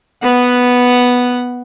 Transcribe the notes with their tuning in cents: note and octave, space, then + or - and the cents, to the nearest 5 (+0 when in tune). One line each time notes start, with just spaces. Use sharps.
B3 +0 F#5 +0